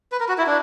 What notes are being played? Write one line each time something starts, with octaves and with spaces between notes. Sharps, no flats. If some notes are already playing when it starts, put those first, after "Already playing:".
B4
A#4
F#4
E4
D4